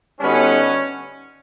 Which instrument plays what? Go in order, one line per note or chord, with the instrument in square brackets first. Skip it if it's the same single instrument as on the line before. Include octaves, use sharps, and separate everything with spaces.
[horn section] D3 G3 B3 D#4 F#4 [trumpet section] C#4